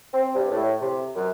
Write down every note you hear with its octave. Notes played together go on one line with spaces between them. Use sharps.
C4
G2
A2
C3
F#2